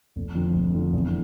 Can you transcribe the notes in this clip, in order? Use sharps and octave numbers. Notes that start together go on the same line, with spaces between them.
F1
F2 D3
F1
F2 D3
E2